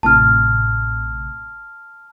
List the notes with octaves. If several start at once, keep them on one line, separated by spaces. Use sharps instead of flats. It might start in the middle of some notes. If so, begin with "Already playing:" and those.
A1 A2 C3 A5 F6